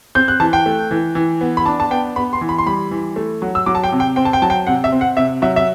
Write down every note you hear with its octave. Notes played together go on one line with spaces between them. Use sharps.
C4 G6
F#6
E3 A5
G5
A3
E3
E3
B3
B5
D4 A5
A5
B3 G5
B3 B5
C6
E3
B5
C6
G3 B5
E3
A3
F#3
E6
F#3 D6
A5
G5
C3
G5
C4 G5
A5
G5
F#3 A5
G5
C3 F#5
E5
C4
F#5
C3 E5
F#3 E5
E5